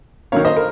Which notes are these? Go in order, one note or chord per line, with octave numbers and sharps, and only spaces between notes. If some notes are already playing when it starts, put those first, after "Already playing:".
D#3 F#3 A#3 C#5 F5
C5 D#5
A#4